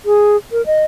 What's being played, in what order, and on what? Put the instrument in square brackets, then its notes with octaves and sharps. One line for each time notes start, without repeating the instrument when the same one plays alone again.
[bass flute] G#4
A#4
D#5